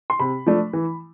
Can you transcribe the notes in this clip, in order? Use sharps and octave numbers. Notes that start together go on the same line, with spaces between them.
C6
C3 B5
F3 A3 D4
E3